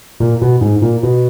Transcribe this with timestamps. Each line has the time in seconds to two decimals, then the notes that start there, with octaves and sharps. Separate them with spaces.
0.20 A#2
0.42 B2
0.61 G#2
0.82 A#2
1.03 B2